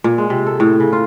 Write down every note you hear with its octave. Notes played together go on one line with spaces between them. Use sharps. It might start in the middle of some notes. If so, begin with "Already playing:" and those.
A#2
G#3
C3
A4
A2
C#3
F4